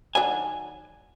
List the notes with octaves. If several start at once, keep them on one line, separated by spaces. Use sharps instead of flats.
D#3 F#3 D4 G#5